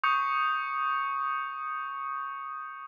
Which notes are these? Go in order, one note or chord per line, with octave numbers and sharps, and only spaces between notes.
C#6 D#6 G6 C#7